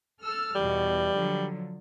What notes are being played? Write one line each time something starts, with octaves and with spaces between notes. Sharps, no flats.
A4 E6 F6
E2 B2 G3
D3 F3 F#3